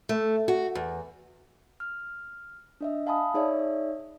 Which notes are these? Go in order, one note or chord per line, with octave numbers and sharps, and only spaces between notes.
A3
F#4
E2
F6
D4 D#5 E5
F5 G#5 A5 B5 D#6
D#4 G#4 C#5 D5 E5